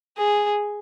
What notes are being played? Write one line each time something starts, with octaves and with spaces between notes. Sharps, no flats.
G#4